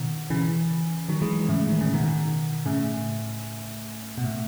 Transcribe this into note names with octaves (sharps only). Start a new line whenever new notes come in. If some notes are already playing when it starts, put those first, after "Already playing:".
Already playing: B2 D#3
C#3 E3
D#3 F#3
E3 G#3
A2 C#3
D#3
C#3
B2 D#3
A2 C#3
B2
A2